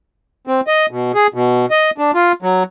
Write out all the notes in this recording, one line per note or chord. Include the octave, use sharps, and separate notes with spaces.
C4
D#5
B2
G#4
B2
D#5
D4
F4
F#3